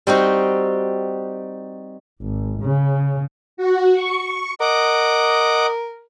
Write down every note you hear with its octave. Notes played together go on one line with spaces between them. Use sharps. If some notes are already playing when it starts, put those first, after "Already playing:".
G3 C4 D#4 F#4
G#1
C#3
F#4
C#6
A#4 D#5 F#5 D6